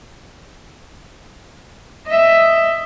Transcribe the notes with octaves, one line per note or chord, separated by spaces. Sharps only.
D#5 E5